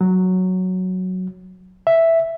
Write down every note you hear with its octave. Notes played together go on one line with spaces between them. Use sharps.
F#3
E5